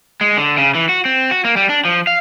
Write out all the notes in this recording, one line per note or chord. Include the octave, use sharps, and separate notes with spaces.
G#3
D3
C#3
E3
F#4
C4
F#4
A#3
G3
D4
F3
F5